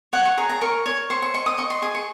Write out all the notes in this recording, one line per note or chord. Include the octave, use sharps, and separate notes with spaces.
C#5 F#5
C#6
G#4 A#5
A#5
A#4 C#6
C#5
C5 C#6
C#6
D#5 C#6
D#6
D#5 C#6
C6
G#4 D#6
C#6